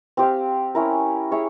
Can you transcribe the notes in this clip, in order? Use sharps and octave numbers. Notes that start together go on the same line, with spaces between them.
C4 G4 C5 F5
C#4 E4 A#4
E4 G#4 C#5